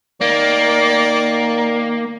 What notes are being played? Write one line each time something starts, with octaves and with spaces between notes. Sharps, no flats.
D#3 A#3 D5